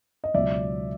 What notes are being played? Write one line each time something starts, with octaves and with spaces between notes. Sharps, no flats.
D#5
C#2 B2 F#3 D5 E5